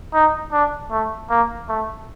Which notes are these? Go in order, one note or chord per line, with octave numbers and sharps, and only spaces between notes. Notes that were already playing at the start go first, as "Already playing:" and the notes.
D#4
D4
A3
A#3
A3